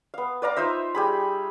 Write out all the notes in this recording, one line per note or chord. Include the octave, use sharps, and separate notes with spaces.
B3 F5
B4 D5 F5 A#5
D#4 F4 C5 E5
G3 G#4 B5